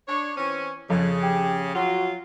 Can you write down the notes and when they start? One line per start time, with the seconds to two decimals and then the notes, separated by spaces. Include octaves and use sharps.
0.08 D4 C#5
0.36 E3 C4 C#4
0.90 F2 C#3
1.23 G4
1.75 F#3 F4 F#4